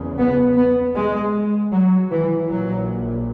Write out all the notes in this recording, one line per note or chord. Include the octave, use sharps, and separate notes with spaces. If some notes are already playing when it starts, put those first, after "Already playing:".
Already playing: F#1 E2 C#3
B3
B3
G#3
F#3
E3
A#1 A#2 F#3